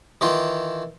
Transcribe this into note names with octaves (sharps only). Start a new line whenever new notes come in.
D#3 E3 F4